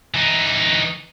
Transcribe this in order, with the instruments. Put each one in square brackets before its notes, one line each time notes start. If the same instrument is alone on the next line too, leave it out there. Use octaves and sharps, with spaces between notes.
[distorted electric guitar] E3 D#4